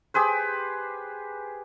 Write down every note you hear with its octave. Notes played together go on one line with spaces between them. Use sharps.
G4 G#4 B4 C5